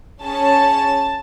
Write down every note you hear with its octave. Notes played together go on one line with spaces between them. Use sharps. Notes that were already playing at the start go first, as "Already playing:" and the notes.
C#4 G#4 A5